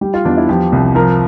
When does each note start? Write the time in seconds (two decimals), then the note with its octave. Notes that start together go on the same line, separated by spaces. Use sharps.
0.01 G3 G4
0.14 F4
0.25 E2 D4
0.37 E4
0.49 F3 G4
0.72 C2
0.95 F3 A#4